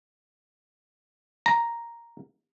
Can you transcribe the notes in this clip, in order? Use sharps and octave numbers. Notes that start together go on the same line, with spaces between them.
A#5